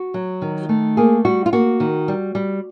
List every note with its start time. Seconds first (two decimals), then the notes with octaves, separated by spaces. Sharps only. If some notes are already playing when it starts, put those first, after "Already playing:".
Already playing: F#4
0.14 F#3
0.42 D#3
0.69 A3
0.97 A#3 G#4
1.25 G3 F#4
1.46 F4
1.53 A#3 F#4
1.80 D#3
2.08 G3
2.35 G3